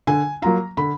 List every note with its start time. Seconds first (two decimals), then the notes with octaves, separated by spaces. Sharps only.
0.07 D3 G#5
0.42 F#3 A#3 F4 A#5
0.77 D3 B5